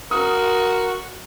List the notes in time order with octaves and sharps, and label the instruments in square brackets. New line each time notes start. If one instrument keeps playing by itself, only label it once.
[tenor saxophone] F#4 [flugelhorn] A#4 [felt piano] D#6